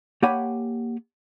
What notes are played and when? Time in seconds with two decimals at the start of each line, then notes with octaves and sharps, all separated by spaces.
0.22 A#3 G4 C#5 F#5 G#5 B5